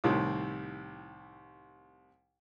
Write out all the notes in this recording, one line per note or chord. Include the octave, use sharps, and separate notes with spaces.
C2 A2 C3 D#3